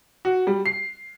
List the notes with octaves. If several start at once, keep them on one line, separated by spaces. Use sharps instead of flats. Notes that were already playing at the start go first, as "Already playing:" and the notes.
F#4
G3
C7